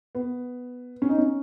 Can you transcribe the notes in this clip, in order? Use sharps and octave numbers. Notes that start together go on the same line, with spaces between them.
B3
C#4
D#4
C#4